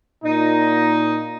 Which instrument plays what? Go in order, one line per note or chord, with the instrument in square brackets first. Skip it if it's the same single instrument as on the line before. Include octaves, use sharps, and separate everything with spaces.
[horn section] A#2 D#4